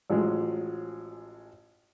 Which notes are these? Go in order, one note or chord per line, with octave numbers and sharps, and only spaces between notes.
A1 F3 F#3 G#3